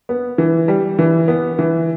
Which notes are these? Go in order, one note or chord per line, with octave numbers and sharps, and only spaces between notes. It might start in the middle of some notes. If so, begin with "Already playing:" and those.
B3
E3
G3
E3
B3
E3